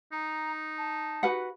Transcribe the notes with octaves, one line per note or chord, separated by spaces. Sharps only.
D#4 A#5
A5
F#4 B4 F#5